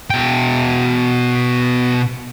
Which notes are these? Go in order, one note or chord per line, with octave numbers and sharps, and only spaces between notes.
B2 G5